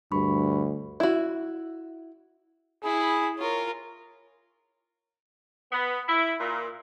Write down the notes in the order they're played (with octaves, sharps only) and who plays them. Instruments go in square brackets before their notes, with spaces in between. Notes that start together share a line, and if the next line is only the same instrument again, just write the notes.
[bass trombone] D2 [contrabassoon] G2 [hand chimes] B5 C#6
[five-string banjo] E4 F#4
[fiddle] E4 B5 [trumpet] G#4
[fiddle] F4 A#4 [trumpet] C#5
[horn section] B3
E4
A#2